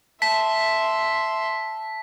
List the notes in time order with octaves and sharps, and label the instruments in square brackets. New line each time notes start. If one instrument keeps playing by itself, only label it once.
[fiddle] E5 C6 [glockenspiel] A5 [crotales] B6